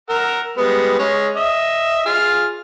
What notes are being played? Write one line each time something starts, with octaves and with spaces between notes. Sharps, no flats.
A#4 F#5 E6
G3 G#3 B3
G#3 C#4 C#5
D#5 E5
F4 G#4 F6